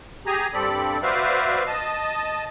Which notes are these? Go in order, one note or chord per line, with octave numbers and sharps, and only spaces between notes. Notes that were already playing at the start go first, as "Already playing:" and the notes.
G4 G#4 G#5 A#5
G2 G3 C4 A4 D5 B5
F#4 B4 C5 D5 E5 F5
D#5 A5